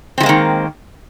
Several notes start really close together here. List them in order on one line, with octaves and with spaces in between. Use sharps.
C4 F3 G#3 A#3 D#3